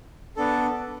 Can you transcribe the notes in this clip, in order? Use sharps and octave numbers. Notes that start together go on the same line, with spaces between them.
B3 D4 A4